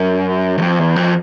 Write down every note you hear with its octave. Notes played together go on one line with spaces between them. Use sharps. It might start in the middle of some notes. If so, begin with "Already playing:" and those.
Already playing: F#2
E2
F2
E2
F2